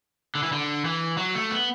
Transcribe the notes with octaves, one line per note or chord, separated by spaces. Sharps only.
D3
E3
D3
E3
F#3
A3
B3